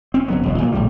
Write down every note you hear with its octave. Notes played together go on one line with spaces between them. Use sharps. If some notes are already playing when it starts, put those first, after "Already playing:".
C4 C#4
F#1 F#3 B3
E1 C#2 B2
A#2 D#3 F3 F#3
A#1 A2 C#3 G3